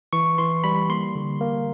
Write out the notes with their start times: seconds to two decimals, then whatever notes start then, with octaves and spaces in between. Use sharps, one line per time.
0.13 E3 C#6
0.38 E3 C6
0.64 G3 B5
0.90 A#3 C6
1.15 D3
1.41 A#3